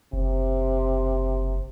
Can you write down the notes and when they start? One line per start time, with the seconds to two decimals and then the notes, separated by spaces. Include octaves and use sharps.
0.13 F#1 C3